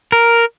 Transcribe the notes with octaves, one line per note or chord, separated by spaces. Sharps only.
A#4